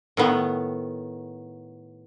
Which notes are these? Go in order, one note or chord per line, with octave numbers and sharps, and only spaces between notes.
A2 D#3 B3